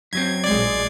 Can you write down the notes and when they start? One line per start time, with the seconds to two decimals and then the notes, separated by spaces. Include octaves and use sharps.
0.13 F#2 F#3 C4 G#6
0.44 A#1 G#3 D5 G#6 C7